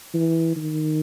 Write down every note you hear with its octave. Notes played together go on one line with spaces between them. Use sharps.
E3
D#3